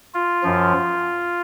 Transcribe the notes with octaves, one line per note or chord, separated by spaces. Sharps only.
F4
F#2 F3